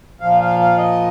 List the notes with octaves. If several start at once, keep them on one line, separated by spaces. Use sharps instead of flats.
A#2 F3 F5
F5
F5
D#5